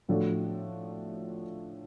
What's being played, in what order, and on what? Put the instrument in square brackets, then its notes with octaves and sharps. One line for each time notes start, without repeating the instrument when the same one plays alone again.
[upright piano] A2 F3 A3 D4 F#4